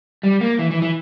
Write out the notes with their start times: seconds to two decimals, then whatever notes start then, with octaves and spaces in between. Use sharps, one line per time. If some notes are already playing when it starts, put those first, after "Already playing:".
0.23 G3
0.41 A#3
0.59 E3
0.71 E3
0.82 E3